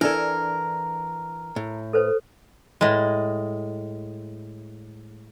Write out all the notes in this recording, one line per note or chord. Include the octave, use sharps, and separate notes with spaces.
E3 D4 A4 A#4 D5
A2
A4 B4 C5
A2 G#3